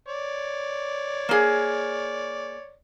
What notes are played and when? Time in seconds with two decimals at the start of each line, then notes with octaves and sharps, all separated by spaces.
0.08 C#5 D5
1.29 A#3 G#4